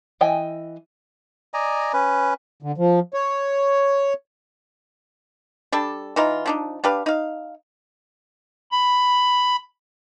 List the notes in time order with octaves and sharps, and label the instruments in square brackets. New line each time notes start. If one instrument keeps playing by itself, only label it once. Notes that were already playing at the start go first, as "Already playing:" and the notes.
[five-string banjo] E3 D#5 G5 G#5
[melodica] D5 D#5 G#5 A#5
C#4 B4
[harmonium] D3
F3
C#5
[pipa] G3 D4 A4
E3 D#4 F4 A#5
F3 D4 D#4
D4 G4 B4 F5
D#4 F5
[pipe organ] B5